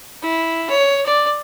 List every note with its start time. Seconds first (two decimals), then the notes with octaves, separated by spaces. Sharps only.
0.23 E4
0.70 C#5
1.06 D5